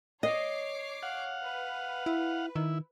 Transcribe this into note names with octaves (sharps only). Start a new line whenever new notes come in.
C#5 D#5 D6 C7
F5 F#5
B4
E4
D#3 E4